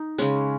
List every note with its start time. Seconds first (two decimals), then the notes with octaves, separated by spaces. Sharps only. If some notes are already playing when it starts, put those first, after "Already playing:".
Already playing: D#4
0.18 C#3 G#3 C#4